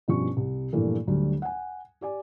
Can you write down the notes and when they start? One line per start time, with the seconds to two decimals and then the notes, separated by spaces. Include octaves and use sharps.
0.08 G2 B2 F3 C#4 C#6
0.37 C2
0.73 G2 A#2 E3 F3 A3 A#3
1.07 D2 F#3 G3
1.42 F#5 G#5
2.01 G4 D5 G#5